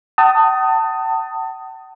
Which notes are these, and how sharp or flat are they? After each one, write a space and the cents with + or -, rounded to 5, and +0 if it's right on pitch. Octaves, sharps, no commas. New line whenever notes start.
F#5 +45 A5 +25 D#6 +0